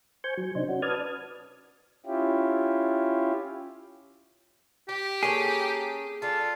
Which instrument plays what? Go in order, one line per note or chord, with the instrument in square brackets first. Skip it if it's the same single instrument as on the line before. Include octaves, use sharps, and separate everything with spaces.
[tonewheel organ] C5 G#5 C#6 G6
F#3
C3 D4 D#4 C5
C#4 F#4
B4 D5 A5 D#6 F6 G#6
[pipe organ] C#4 E4 F4 G4
[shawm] G4 [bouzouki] G5
[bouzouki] A#3 C#4 A4 [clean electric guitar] G#4
[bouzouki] D4 A4 [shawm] F4